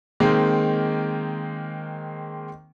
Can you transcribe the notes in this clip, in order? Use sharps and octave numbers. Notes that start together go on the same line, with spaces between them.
D#3 G#3 A#3 C4